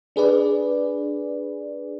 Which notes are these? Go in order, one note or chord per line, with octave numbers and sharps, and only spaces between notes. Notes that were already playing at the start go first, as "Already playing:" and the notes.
D4 G#4 B4 D5